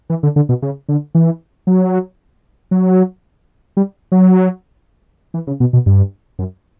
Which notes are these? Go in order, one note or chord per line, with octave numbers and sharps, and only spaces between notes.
E3
D3
D3
B2
C#3
D3
E3
F#3
F#3
G3
F#3
E3
C#3
B2
B2
G2
F#2